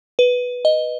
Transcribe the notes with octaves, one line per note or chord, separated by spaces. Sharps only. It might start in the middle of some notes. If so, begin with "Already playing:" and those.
B4
D#5